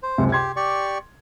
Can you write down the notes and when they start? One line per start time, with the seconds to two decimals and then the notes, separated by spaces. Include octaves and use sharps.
0.03 C5
0.18 C#2 F#2 C3
0.32 G4 C6 G#6
0.56 G4 D5 C#6